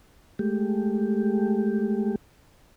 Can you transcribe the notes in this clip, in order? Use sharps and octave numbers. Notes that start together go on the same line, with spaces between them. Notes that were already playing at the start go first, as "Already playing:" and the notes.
G#3 A3 G4